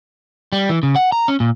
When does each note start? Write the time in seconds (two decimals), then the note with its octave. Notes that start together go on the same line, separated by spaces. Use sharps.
0.52 G3
0.69 E3
0.83 C#3
0.96 F#5
1.12 A#5
1.28 C#4
1.40 A#2